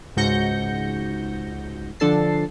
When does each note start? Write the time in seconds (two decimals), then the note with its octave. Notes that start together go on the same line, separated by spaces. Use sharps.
0.17 C#2 G#2 F#4 G6 A#6 C#7
2.00 D3 F3 D4 A4 A6 C7